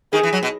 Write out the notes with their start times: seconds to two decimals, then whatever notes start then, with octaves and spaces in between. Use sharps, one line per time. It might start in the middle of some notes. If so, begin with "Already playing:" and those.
0.12 D#3 G#4
0.23 E3
0.33 F#3
0.43 B2